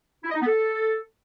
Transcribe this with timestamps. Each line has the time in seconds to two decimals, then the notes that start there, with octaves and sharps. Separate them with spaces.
0.23 E4
0.29 D#5
0.35 D#4
0.41 B3
0.47 A4